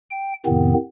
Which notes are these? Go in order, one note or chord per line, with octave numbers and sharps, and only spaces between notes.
G5
F2 A2 C3 D#3 B3 C4